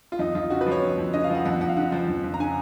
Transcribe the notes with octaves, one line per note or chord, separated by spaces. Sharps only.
F4
F2 D#4
F2 F4
C#3 F#4
B4
F3
C#5
F2
F2
C#3 D#5
F5
F3
F#5
F2 F#5
F2 F#5
F5
C#3 F#5
F3
F2
F2
A#5
C#3 G#5